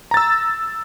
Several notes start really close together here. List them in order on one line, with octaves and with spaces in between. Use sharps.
A#5 A6 E6